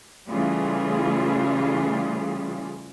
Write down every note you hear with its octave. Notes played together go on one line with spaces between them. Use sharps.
C#3 E3 G3 A3 F4 G#4